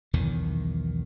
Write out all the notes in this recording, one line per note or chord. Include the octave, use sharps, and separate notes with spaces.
B1 E2 D#3